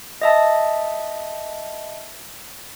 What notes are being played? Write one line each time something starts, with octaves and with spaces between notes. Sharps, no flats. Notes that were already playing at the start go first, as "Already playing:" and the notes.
D#5 E5 A5